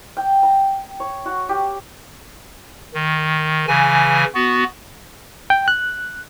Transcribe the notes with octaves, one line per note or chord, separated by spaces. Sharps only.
G5
A#5
C#5
F#4
G4
D#3
C#3 E3 G#5
B3 F#4
G5
F#6